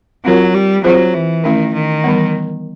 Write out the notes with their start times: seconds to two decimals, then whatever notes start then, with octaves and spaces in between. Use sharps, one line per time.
0.25 F#3 C4 F4 A#4 C#5
0.54 G3
0.84 F#3 C4 F4 G#4 C5
1.14 E3
1.44 D#3 E3 A3 C#4 E4
1.74 D#3
2.04 E3 G3 B3